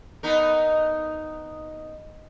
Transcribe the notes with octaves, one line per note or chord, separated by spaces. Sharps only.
B3 D#4 A#4